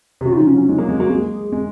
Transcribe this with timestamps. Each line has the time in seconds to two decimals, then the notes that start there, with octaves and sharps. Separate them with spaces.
0.21 C3
0.25 C#3 F#4
0.32 F4
0.37 F3 D#4
0.47 C#4
0.54 F#3
0.57 C#4
0.68 G#3 D#4
0.78 A#3 G#4
0.89 G#3
0.99 A#3 F#4
1.10 G#3 G#4
1.52 G#3